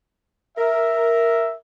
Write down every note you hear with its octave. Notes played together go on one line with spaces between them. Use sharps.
A#4 E5